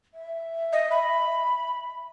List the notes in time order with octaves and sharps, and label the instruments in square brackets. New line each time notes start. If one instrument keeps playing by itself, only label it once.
[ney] E5
[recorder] D#5
B5